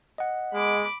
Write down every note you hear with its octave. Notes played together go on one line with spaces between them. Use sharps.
D#5 F#5
G#3 B5 D6